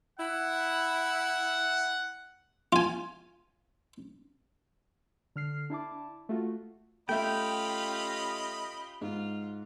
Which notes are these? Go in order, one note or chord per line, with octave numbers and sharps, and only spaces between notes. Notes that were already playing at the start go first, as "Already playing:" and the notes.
E4 F#5
F4 G#5
D3 F6 C7
D4 E4 A5 D6
A3 F4 F#4
A3 C#4 F4 G4 D#5 E5 G5 B5
G#2 F4